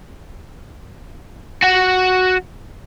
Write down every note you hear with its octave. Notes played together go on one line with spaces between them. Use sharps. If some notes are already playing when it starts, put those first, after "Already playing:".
F#4 F#5